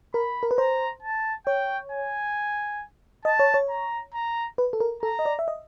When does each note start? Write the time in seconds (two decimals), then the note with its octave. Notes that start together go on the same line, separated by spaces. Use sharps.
0.14 A#4 B5
0.43 A#4
0.51 B4
0.58 C5 A#5
1.03 A5
1.47 C#5 G5
1.92 G#5
3.25 D#5 A5
3.40 C#5
3.54 C#5
3.69 A#5
4.14 A#5
4.58 B4
4.73 A4
4.80 A#4
5.03 A4 A#5
5.19 D#5
5.26 D5
5.39 E5
5.48 D#5